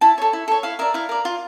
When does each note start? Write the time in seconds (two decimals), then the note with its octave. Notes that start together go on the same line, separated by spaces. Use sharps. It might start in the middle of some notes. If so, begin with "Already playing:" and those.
0.01 E4 A5
0.18 A4 C#5
0.33 E4
0.48 A4 C#5
0.63 E4 F5
0.79 A#4 D5 E5
0.94 E4 F5
1.09 A#4 D5
1.25 F4